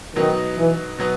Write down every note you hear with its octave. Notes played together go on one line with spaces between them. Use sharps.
B2 D#3 F#3 B3 D#4
E3
B2 F#3 B3